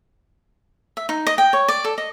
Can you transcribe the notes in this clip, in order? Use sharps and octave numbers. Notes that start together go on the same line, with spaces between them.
E5
D#4
D#5
G5
C#5
D5
A4
D#5